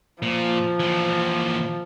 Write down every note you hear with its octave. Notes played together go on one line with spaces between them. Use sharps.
A#2 F3
A#2 E3